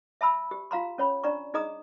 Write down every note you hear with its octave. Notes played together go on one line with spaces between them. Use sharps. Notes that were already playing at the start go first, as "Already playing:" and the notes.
E5 A5 B5 E6
G4
F4 F5 A#5 C6
C#4 C#5 B5
D4 D5 A#5 C#6
D#4 G#4 D#5 A#5 D#6